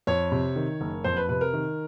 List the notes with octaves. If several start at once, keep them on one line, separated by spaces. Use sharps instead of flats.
F2 C#5
C3
D#3
F#1
F2 C5
B4
C3 B4
A#4
D#3